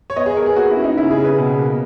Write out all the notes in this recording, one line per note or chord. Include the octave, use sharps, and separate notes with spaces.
C#5
B3 D#5
G#4
B3 A#4
G#4
A#3 F#4
E4
C#4
D#4
C#3 E4
G#4
C#3
B4
B2
A#3